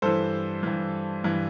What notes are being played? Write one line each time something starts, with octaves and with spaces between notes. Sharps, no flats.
G2 E3 A4 C5
G2 E3
G2 E3